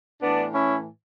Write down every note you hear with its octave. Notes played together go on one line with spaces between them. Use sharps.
A2 E3 B3 D4
C#4 E4